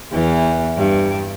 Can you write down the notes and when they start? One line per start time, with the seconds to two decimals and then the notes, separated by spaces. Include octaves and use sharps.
0.12 E2 E3
0.77 G2